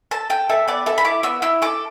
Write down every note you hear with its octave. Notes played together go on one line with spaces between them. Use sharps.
A4 A5
A4 G5
A4 E5
B3 D5
A4 E5
B5
E4 D6
B3 E6
E4 E6
A4 D6